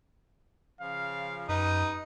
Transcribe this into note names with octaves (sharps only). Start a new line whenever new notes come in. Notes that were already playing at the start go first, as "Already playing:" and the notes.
C#3 F3 F5
F#2 D#4 G4 B4 D#5 D#6